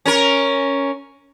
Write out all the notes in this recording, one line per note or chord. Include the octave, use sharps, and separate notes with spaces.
C#4 A#4